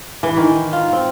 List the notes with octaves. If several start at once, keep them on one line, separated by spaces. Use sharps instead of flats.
E3
D#3
F4
C4